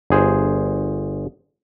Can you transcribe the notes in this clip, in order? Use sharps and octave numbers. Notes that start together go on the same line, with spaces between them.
G1 G#4 C5